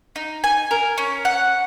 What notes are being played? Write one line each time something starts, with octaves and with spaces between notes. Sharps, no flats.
D#4
G#5
A#4
C#4
F#5